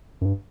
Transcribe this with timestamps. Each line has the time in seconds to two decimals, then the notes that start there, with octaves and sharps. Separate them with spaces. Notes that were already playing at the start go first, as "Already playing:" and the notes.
0.21 F#2
0.26 G2